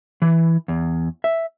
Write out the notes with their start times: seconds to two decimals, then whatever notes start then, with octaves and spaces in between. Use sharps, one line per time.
0.22 E3
0.68 E2
1.24 E5